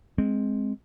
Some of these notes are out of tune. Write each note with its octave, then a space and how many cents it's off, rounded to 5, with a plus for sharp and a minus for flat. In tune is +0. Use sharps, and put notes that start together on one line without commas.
G#3 +5 C4 +0